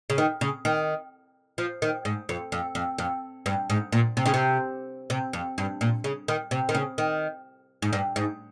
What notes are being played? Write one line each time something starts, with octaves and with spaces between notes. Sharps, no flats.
C#3
D#3
C#3
D#3
F3
D#3
G#2
F2
F2
F2
F2
G2
G#2
A#2
C3
C#3
C3
C3
F2
G2
A#2
C#3
D#3
C3
D#3
C#3
D#3
G#2
G2
G#2